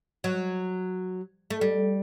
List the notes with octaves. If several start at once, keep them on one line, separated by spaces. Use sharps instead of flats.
F#3
A3
G3